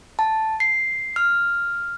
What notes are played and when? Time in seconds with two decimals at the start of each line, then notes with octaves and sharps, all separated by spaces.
0.19 A5
0.60 C7
1.16 F6